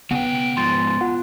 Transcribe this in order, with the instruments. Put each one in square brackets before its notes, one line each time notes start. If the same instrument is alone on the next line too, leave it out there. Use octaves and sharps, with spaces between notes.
[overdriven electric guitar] C#3 G5 [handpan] B3 [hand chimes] F#5
[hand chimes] D7
[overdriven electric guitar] G#2 F3 [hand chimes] C6 A6
[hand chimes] F4 F#5